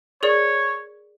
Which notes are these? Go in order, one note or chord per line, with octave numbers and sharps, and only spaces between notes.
G#4 A#4 C#5 D5